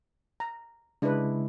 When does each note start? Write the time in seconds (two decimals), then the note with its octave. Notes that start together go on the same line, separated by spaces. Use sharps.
0.40 A#5
1.02 C#3 G#3 D4 E4 B4